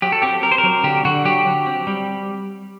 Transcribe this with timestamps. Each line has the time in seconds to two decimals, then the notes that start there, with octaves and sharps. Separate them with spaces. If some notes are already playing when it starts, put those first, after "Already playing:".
0.02 F#3 G4
0.12 A4
0.22 C4 G4
0.43 C4 A#4
0.52 C5
0.58 A#4
0.64 F#3
0.83 D3 G4
1.05 D3 F#4
1.25 F#3 G4
1.45 F#3
1.66 C4
1.87 G3